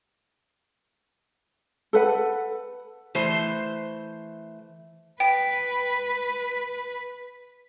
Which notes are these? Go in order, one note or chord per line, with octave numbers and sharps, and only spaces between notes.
A4 B4 F#5
E3 A3 C5
B4 G5